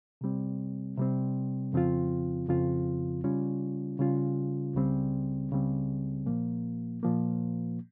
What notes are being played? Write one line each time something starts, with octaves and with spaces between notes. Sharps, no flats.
C3 G3 C4
C3 G3 C4
F2 C#3 F3 C4 F4
F2 C#3 F3 C4 F4
C#3 G3 C#4 F4
C#3 G3 C#4 F4
C#2 C#3 G3 C4
C#2 C#3 G3 C4
A#2 F3 A#3
A#2 F3 A#3